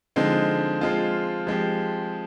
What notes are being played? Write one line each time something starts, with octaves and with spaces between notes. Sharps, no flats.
D3 F3 G#3 C4 D#4
F3 G#3 C4 F4
F3 G#3 C4 G4